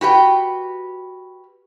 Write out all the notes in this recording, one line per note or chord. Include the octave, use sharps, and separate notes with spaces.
F#4 G4 B4 G5